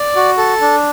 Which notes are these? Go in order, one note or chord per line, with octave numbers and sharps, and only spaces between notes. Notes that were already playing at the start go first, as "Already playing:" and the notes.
Already playing: D5
F#4
A4
D4